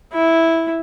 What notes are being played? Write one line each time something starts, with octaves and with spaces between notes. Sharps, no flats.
E4